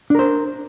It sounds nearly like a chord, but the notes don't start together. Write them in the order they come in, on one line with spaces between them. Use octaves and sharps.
D4 A#4 C5